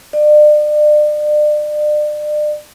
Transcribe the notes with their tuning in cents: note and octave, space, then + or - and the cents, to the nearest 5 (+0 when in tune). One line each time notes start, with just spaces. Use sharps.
D5 +35